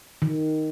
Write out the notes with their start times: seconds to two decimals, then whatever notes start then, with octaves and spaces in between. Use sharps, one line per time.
0.22 D#3